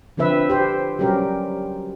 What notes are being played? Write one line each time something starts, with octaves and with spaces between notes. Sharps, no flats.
D3 F3 C4 B4 E5
G4 C5
F#3 G3 C#4 G4 A#4